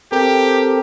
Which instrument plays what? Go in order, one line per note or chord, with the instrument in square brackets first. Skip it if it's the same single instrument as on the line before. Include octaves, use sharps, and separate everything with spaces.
[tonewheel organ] C4 A4 A#4 [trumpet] G4